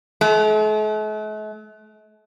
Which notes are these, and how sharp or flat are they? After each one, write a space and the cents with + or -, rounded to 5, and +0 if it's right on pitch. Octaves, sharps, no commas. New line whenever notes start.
A3 -45